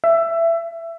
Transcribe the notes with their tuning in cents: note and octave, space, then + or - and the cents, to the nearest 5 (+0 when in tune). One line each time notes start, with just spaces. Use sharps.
E5 +20